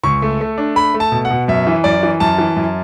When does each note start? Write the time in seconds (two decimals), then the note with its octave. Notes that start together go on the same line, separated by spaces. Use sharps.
0.04 C#2 C#6
0.22 A3
0.41 A3
0.58 D4
0.76 A3 B5
0.94 A3
1.00 A5
1.12 B2
1.25 F#5
1.30 B2
1.48 F#2 E5
1.67 E3
1.84 F#2 D5
2.03 E3
2.20 F#2 A5
2.38 E3
2.56 F#2